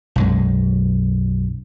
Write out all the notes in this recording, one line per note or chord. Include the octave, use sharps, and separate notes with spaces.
B1 F#2 G#3